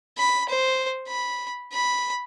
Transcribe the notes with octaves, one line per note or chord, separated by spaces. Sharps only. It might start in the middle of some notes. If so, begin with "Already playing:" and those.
B5
C5
B5
B5